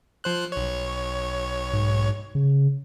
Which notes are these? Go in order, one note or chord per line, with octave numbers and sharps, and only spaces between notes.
F3 C5 F#6
B1 C#5
G#2
C#3